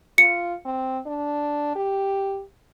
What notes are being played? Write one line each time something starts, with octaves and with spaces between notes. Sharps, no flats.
F4 C#7
C4
D4
G4